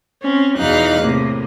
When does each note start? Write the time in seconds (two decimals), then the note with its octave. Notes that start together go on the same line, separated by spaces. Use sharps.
0.22 C4 C#4
0.58 E2 B2 E3 D#4 F5 F#6
0.99 A2 C3 A#3